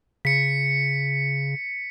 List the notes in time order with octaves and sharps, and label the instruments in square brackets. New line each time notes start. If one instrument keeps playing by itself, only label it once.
[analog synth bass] C#3 [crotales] B6 C#7